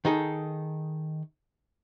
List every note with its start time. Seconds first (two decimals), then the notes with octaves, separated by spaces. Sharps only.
0.05 D#3 D#4 G#4 A4